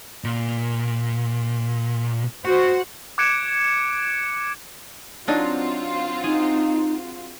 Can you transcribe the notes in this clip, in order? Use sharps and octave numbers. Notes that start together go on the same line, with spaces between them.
A#2
F#4 C5 F#5
D6 F#6 G#6 C#7 D7 E7
F#3 C4 D4 D#4 F4 F#4
D#4 G#4